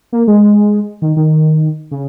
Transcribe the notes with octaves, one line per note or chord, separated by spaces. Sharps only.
A#3
G#3
D#3
D#3
C#3